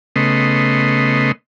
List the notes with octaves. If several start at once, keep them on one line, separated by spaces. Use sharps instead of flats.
C#3 A3 B3 D#5 C6